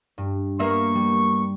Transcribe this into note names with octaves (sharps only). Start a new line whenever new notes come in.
G2
A#3 B3 E5 C#6
G3